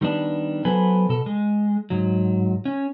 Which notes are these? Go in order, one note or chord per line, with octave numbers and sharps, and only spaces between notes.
D#3 G3 B3 D4
F#3 B3 A4 B4 C5 G#5
B2 A4
G#3
G#2 F#3
C#4